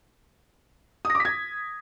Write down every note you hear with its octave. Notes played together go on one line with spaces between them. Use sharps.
D#6
A#6
D6
B6
G#6